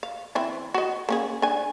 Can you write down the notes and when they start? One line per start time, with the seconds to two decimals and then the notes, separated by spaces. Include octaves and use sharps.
0.03 F5
0.35 E3 C4 E4
0.74 F#4 D#5
1.09 A#3 C#4 G#4
1.42 D4 G#5